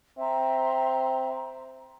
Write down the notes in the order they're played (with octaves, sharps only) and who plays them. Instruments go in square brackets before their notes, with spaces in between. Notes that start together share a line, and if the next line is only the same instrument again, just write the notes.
[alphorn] C4 [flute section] E5 A#5 C6